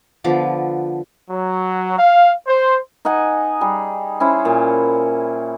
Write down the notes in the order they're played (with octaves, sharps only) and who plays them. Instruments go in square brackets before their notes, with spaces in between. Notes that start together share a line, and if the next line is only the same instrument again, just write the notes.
[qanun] D3 F3 B3 D6
[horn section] F#3
F5
C5
[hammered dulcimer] D#4 D#5 F#5 G#5
G3 G#4
C#4 E4 C5
A#2